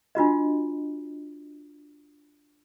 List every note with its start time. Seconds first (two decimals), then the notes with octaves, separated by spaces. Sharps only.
0.15 D4 F4 F#4 D#5